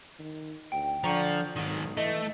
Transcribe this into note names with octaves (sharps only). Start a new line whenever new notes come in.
D#3
D2 G5
D3 F3 A#5 C#6 C#7
B1 G#2 D#3
E3 A3 D#5